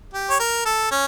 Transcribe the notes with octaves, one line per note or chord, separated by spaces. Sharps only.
G4
C#5
A#4
A4
C#4